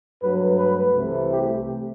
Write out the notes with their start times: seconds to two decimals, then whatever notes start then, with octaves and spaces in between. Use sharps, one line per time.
0.22 G2 F#3 A3 B4
0.59 B4
0.95 C2 C3 E3 A3
1.31 G4